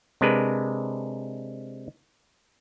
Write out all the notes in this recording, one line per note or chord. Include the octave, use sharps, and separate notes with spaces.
C3 G#3 D4 A#4 B4